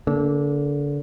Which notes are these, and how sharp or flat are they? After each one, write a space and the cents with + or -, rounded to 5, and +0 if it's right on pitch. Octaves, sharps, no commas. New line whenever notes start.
D3 -30 A#3 +0